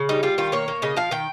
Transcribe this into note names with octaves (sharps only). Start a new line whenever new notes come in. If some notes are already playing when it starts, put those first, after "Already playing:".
Already playing: C#3
G3 D#4
G3 F4
D#3 F4
A#3 C#5
A#3
C#3 D#5
F3 F5
D#3 G5